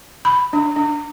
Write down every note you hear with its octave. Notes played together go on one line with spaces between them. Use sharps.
B5
D4
D4